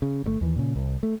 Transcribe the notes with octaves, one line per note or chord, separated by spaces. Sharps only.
C#3
G1 C3 A3
D#2 E3
A#2 C#3
C2
A3